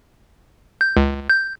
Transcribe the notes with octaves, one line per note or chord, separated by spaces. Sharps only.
G6
C#2
G6